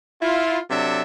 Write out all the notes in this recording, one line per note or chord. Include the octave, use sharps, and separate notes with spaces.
E4 F4
C3 F#3 D4 A4 E5